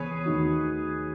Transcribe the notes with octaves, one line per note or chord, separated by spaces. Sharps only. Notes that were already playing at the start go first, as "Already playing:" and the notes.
Already playing: C#2 C#3 E3 B3 G#4 B4 C#5
D#2 D#3 A3 D#4 F#4